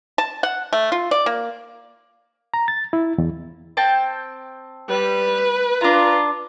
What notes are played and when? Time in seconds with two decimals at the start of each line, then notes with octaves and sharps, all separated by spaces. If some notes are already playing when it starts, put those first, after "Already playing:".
0.18 A5
0.43 F#5
0.73 A3
0.92 F4
1.11 D5
1.26 A#3
2.54 A#5
2.68 A6
2.93 E4
3.18 E2
3.77 C4 G5 A5
4.88 G3 B4
5.81 D4 F4 A#5